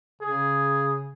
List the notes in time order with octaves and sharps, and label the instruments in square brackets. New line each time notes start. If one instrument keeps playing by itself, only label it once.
[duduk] C#3 [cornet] G#4